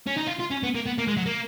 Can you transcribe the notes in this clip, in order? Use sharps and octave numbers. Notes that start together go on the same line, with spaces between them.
C#4
D#4
F4
F4
C#4
B3
A#3
B3
A#3
G#3
F#3
A#3